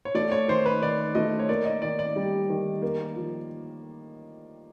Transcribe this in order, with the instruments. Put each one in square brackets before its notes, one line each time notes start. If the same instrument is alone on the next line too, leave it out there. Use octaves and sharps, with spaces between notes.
[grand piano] C#5
[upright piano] A3 [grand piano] D5
[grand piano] C#5
[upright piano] D#3 [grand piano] C5
[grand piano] B4
[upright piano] D#3 [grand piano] D5
[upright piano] A3 [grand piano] D#5
[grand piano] C#5
[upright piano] A#3 [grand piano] D5
[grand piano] D#5
[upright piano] D#3 [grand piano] D5
[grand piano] D5
[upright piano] G3
D#3
A#3
F3